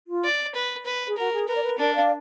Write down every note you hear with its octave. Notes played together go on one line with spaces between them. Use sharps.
F4
D5
B4
B4
G#4
F#4 A#4
G#4
A#4 B4
D5
B4
D4 A#4 D5
D5 F5